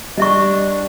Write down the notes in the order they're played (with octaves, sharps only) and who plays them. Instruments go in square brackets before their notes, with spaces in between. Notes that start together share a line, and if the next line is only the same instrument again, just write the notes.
[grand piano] G3 [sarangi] D4 [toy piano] D#5 E5 C#6